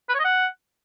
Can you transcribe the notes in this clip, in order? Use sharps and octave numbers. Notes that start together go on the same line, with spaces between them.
B4
C#5
D#5
F#5